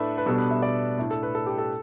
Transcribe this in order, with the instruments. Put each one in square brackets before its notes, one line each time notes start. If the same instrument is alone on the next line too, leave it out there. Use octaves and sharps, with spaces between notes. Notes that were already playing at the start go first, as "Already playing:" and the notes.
Already playing: [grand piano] A2 A3 D4 A4 B4 E5
B4
B2 G3 B3 D4 A4
B4
E5
D5
A2 A3 D4
A4
B4
A4
G4
A4